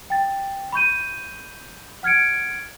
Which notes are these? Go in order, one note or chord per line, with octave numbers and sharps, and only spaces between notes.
G5 A6
B5 C#6 G6 D#7
F#5 F6 G#6 C#7 D7